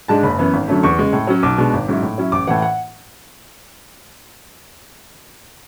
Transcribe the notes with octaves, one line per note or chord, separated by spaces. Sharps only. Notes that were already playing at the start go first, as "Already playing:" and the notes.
G#2 G#3 D4 A5
F#1 B5
F#2 E3 B3
G#1
F#2 D3 F#3 A3
E2 C#6
C#3 G#3
A2
F#3 C#4
B1 D6
B2 G#3 D4
G#1
G#2 F#3 C#4 E4
A2
F#3 C#4 E4
A1 D6
A2 E3 F#5
F#5